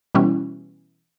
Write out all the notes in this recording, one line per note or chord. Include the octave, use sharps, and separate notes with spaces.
B2 E3 G3 C#4